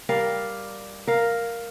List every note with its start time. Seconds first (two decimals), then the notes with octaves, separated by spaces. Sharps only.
0.09 G3 A#4 D5 F5
1.07 A#4 F5